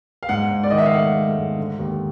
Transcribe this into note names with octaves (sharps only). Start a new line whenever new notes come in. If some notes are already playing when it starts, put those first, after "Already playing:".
F5
G#2 F#5
G#2
D5
D#3 D#5
E5
F5
A3 F#5
A3
G#2
D3
D#2